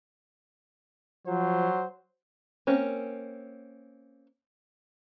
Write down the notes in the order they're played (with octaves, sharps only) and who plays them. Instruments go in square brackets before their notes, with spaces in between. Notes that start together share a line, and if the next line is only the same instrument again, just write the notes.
[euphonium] F3 [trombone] F#3 [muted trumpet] C5
[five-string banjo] A#3 C4 C#4